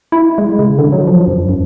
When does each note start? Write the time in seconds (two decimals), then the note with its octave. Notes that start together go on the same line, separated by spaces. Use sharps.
0.12 E4
0.38 G#3
0.59 C#3
0.79 D3
0.92 F#3
1.07 F3
1.27 F#2
1.49 F#2